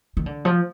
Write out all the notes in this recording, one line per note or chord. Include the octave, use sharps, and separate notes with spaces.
D#3
D3
F3